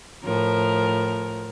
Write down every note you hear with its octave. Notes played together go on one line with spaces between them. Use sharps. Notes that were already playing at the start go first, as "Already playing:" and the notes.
A2 F3 A#4